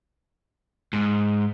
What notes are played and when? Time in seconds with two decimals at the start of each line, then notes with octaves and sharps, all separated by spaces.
0.93 G#2